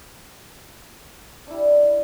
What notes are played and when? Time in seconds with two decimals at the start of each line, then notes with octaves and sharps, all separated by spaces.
1.47 D4
1.50 E4
1.54 G3